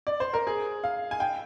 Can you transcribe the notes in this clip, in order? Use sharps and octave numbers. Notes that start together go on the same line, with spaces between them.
D5
C5
A#4
G#4
F5
G#5
G5